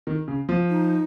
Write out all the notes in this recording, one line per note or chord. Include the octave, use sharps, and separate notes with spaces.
D#3
C#3
F3
D#4